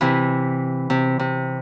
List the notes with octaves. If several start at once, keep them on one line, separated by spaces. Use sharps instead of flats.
C3 E3
C3
C3